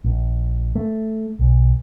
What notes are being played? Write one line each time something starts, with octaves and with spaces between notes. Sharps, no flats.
A#1
A3
B1